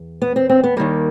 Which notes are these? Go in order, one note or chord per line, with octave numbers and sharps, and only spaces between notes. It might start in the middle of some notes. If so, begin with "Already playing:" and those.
Already playing: E2
B3
C4
C4
B3
D#2 D#3 G3 A#3